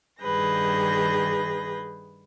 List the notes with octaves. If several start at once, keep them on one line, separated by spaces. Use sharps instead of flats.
G2 D#3 G#4 B4 G6 A#6